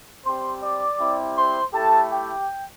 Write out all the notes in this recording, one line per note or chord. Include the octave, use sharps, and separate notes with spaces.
G3 C4 G4 C5 C6
D5 D6
G3 C4 E4 G4
C5 C6
A3 E4 G4 A4 A5
G4 G5